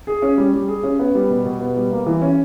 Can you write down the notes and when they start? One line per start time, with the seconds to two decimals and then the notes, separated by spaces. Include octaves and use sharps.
0.07 G#4
0.22 C#4
0.38 G3
0.54 G3
0.68 G#4
0.83 C#4
0.99 B3
1.15 G3
1.30 B2
1.45 B2
1.61 B3
1.77 G3
1.91 A#3
2.07 E3
2.22 C#4